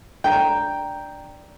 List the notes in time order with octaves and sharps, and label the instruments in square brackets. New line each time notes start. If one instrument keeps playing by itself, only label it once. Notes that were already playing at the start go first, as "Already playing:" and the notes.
[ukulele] D4 A#5 [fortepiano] G5